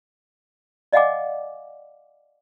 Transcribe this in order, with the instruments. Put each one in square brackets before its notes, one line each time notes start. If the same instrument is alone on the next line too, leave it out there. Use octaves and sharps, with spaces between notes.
[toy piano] D5 D#5 F5 F#5 G#5 D6